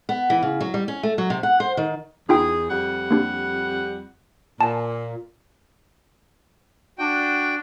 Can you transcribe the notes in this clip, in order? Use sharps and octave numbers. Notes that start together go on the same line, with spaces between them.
B3
E3
C#3
F#3
G3
C#4
A3
F#3
C3
F#5
C5
D#3
E2 D#4 F4 G#4 G5
F2 G3 F#5
A#3 D4 G4
A#2 G#5 A5
D4 F#4 G5